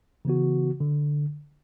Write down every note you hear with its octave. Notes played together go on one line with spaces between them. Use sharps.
C#3 E3 B3 F#4
D3